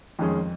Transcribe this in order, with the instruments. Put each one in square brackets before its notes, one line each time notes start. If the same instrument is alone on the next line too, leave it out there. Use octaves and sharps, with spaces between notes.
[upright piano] F2 [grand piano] D#3 G#3 C#4 G#4